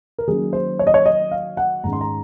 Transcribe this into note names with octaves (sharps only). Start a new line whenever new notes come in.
A#4
D#3 F#3 A#3 C#4 G#4
C5
C#5
D#5
C#5
D#5
F5
F#5
G#2 D#3 G#3 C#4 A#5
C6
A#5